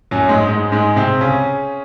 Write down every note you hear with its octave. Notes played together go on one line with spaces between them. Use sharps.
F#2 F#3
G#2 G#3
G#2 G#3
G#2 G#3
C3 C4
C#3 C#4